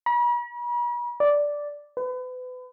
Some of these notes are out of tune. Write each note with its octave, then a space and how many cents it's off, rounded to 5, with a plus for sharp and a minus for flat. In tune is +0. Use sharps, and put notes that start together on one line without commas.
B5 -45
D5 -5
B4 +35